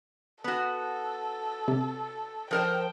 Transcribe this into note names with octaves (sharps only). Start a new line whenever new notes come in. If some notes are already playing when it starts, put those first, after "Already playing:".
B3 F#4 A4
C3
F3 A#4 C5 G5